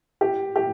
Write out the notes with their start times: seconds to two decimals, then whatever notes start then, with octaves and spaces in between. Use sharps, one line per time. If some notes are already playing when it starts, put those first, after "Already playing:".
0.21 G4
0.56 G4